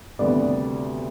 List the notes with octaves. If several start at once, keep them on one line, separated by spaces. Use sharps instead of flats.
D2 C3 D#3 G3 B3 D5